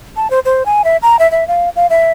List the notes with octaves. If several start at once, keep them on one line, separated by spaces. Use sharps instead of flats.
A5
C5
C5
G#5
E5
A#5
E5
E5
F5
F5
E5